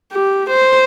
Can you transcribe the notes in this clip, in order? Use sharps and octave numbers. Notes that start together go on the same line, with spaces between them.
G4
C5